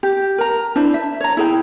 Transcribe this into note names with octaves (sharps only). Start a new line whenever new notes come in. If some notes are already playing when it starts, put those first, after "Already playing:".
G4
A#4 A#5
D4 E4 C5
E5
C#5 A#5
E4 G#4 G5